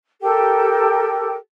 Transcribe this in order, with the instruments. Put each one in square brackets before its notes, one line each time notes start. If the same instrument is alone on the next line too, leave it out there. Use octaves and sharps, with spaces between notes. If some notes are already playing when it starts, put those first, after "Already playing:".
[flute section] G4 A4 A#4 G5